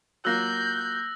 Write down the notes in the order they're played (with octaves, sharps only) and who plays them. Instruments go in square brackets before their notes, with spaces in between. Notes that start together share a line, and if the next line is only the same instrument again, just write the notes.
[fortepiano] F#3 A#3 F4 [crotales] E6 F#6 A#6 [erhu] G6